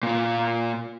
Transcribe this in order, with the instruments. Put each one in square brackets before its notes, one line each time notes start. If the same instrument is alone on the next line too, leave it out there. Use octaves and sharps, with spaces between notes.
[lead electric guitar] A#2 F4